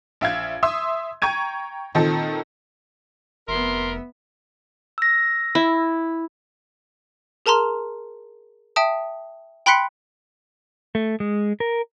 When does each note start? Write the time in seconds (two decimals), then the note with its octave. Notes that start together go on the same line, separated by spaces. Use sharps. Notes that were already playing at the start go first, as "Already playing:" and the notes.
0.21 A#1 E5 F5 G#6
0.63 E5 C6 D#6 E6
1.22 G5 A#5 C#6 G#6 D#7
1.95 A#2 D#3 C4 D#4 A4
3.48 F1 B3 A#4 E5 C6
4.98 E6 A#6
5.55 E4
7.46 G#4 A#4 A5 A#5 C6 F6
8.76 E5 G5 A5 D#6
9.66 G5 B5 C6 F#6 B6 C#7
10.95 A3
11.20 G#3
11.60 A#4